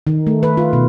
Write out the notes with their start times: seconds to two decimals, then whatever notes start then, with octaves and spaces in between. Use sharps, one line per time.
0.07 D#3
0.27 A3
0.43 B4
0.57 F4
0.73 B2